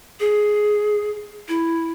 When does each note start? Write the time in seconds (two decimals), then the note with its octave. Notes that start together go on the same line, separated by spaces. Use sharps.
0.20 G#4
1.48 E4